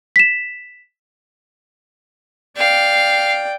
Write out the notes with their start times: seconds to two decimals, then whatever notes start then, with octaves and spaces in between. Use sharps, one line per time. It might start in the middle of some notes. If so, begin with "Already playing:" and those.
0.16 B6 E7
2.57 D5 F5 G5